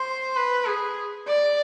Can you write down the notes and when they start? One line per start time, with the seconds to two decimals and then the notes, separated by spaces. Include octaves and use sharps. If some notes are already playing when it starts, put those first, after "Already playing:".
Already playing: C5
0.36 B4
0.65 G#4
1.27 D5